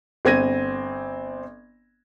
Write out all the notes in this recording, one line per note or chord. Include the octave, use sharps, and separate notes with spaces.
G1 C4 G#6 A#6 D#7